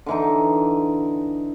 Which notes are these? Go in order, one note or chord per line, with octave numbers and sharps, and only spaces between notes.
D3 E3 D#4